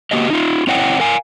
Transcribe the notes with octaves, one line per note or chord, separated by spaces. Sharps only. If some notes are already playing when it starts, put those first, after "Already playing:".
A#3 F#4 G4 D#5
D#4 F4
C4 E4 C#5 D#5 F#5 G5
A#4 F5 G#5